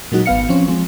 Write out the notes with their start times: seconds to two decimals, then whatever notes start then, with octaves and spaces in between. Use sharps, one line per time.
0.12 A#2 F#3 G#3 D#4 F#4
0.26 G#1 B3 F5 C#7
0.49 F3 C4 C#4
0.68 F3 G#3 C4